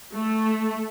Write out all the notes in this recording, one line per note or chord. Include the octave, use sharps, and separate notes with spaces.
A3